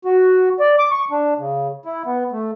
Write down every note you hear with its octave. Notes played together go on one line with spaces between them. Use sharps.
F#4
D5
D6
C#6
D4
C#3
E4
B3
A3